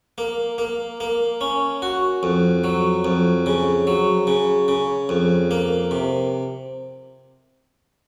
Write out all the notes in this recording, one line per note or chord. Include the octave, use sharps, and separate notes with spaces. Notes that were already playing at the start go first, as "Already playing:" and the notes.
A#3
A#3
A#3
C#4
F#4
F2
F#3
F2
C#3
F#3
C#3
C#3
F2
A#3
C3